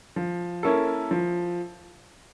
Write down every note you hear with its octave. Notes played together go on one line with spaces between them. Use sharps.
F3
A#3 C#4 E4 A4
F3